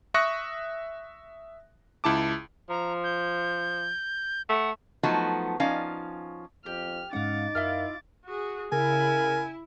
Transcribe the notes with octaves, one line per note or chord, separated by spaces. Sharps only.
E5 C#6 D#6 F#6 A#6 C#7
C#2 E4 A5 D6
F3 A#5
G6
A3 F#5
F3 F#3 A3 B3 D#4 F#4
F3 C#4 D#4 D5 F5
F2 G4 F6
G#2 G#3 C#4 D#4 F5 F#5 D6 A6
F#2 E4 F4 A#4 E5 F6
F#4 G#4
C#3 E4 A#4 G#5